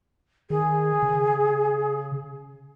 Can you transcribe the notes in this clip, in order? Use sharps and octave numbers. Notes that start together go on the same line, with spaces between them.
D#3 G#4
C#3